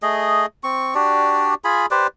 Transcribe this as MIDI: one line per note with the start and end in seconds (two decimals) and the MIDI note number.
0.02 0.46 57
0.02 0.46 68
0.02 0.46 75
0.64 0.94 60
0.64 0.94 85
0.95 1.54 62
0.95 1.54 66
0.95 1.54 67
0.95 1.54 74
1.64 1.86 65
1.64 1.86 68
1.64 1.86 80
1.64 1.86 83
1.91 2.07 67
1.91 2.07 71
1.91 2.07 72
1.91 2.07 74